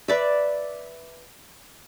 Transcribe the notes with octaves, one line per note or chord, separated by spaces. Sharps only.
B4 D5 E5